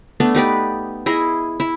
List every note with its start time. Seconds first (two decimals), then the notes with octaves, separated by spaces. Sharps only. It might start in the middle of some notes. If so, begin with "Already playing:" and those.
0.20 A3 B3 D4
0.35 D#4 G4 B4 D5
1.06 E4 G#4 D#5
1.60 E4